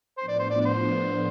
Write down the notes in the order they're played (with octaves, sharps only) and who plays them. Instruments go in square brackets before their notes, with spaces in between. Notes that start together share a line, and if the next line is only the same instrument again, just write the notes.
[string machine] A2 F3 B3 D4 [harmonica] C5
[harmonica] D5
C5
D5
D5
C5